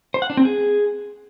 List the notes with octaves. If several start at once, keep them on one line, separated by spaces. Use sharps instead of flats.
C5
F#5
D4
C4
G#4